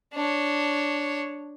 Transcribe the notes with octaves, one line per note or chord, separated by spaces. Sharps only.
D4 C#5